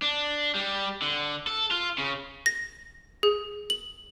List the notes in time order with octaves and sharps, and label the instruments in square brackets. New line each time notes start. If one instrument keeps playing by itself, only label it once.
[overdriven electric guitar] D4
G3
D3
A4
F4
C#3
[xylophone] A#6
G#4
F#7